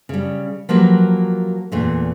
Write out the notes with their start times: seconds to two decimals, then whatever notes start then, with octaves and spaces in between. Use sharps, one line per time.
0.09 C#3 G3
0.69 F3 F#3 A#3 G4 B4
1.72 E2 A#2 A3